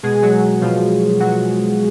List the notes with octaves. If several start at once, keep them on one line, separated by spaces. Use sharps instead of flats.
B2 G#3 G#4
F#3 F#4
B2 F3 F4
B2 F#3 F#4